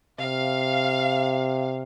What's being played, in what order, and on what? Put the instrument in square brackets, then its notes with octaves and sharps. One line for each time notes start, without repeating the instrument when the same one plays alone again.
[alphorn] C3 [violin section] F5